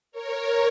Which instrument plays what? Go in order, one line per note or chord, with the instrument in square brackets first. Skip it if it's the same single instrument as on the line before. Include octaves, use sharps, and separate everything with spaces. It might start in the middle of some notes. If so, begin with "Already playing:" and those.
[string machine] A#4 C#5